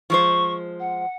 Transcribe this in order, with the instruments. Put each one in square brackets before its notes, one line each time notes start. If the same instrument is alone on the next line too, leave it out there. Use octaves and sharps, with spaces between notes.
[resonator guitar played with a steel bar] F3 G#3 C5 [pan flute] C#6
[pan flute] F#5